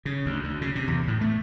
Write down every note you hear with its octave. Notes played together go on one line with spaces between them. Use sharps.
C#3
D2
D2
C#3
C3
E2
A2
A3